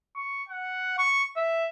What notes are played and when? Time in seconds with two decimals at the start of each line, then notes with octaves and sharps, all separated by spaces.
0.16 C#6
0.49 F#5
0.98 C#6
1.37 E5